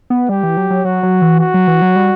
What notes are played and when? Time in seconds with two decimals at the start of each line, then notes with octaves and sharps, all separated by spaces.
0.10 B3
0.29 G3 G4
0.43 E3
0.57 F#3
0.70 F#3
0.85 F#3 F#4
1.03 F#3
1.22 E3
1.40 F#4
1.54 F#3
1.67 E3
1.82 F#3
1.96 G3